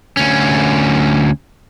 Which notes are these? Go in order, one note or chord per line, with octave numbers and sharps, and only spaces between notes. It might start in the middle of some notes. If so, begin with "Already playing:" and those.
D2 C#4